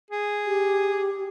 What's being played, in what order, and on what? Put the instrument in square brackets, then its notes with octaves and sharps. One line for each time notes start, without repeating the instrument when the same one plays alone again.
[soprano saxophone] G#4
[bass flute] G4